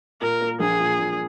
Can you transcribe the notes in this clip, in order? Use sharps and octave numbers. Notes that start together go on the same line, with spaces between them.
A#2 A#4
A#3
A#1 G#4
A#2
A#2